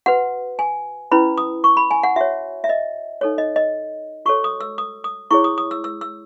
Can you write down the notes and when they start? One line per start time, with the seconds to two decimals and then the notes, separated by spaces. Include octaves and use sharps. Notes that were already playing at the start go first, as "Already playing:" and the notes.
0.06 F#4 B4 F#5
0.59 G#5
1.11 C#4 E4 B4 B5
1.38 D#6
1.64 C#6
1.77 B5
1.91 G#5
2.03 F#5
2.16 F#4 C#5 E5
2.64 E5
2.69 D#5
3.21 D#4 A4 C#5
3.38 D#5
3.56 D#5
4.26 F#4 A4 C#5 C#6
4.44 D#6
4.61 E6
4.78 D#6
5.04 D#6
5.31 E4 G#4 C#5 C#6
5.44 D#6
5.58 D#6
5.71 E6
5.84 E6
6.01 E6